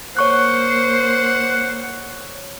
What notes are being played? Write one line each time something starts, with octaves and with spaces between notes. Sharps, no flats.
A#3 C5 C#5 F#5 C#6 F#6